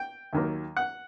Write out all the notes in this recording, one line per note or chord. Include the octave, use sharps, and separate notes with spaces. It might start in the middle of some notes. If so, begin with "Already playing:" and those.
Already playing: G5
D#2 D#3 F#3 A#3
F#5